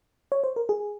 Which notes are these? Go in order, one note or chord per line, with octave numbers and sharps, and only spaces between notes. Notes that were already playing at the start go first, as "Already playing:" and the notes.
C#5
C5
A#4
G#4